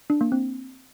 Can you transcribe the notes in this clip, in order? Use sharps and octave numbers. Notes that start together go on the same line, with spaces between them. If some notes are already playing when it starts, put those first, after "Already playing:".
D4
A#3
C4